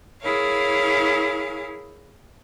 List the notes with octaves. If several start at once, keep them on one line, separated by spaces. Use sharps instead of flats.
E4 G#4 A#4 C#5 F5